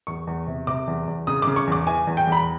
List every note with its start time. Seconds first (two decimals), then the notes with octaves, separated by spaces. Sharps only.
0.07 E2 C#6
0.27 E2
0.47 C3
0.67 C3 D6
0.87 E2
1.07 E2
1.27 C#3 D#6
1.42 C#3 D6
1.56 C#6
1.67 E2 D6
1.87 E3 G#5
2.07 E2
2.17 G5
2.27 E2
2.32 B5